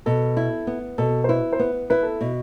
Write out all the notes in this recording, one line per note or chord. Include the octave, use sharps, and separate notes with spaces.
B2 A4
E4
B3
B2 A4
C5
E4 B4
C5
B3 B4
E4 B4
A4
B2